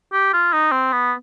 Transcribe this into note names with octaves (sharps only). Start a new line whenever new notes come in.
G4
F4
D#4
C4
B3